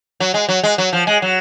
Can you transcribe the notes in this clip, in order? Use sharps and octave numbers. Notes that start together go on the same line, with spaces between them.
F#3
G#3
F#3
G#3
F#3
F3
G#3
F#3